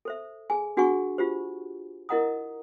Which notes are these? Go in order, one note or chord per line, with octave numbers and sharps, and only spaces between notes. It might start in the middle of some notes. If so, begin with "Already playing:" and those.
A4 C5 E5
G#4 G#5
D4 F#4 G#4 F#5 G#5 C#6
F4 G4 C5
E4 A#4 D#5 F#5 A#5 D#6